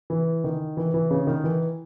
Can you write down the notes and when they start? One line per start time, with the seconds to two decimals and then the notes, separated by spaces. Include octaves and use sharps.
0.10 E3
0.44 D#3
0.77 E3
0.94 E3
1.10 C#3
1.27 D#3
1.44 E3